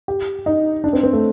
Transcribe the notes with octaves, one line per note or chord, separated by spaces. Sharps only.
G4
D#4
D4
C4
C4
A3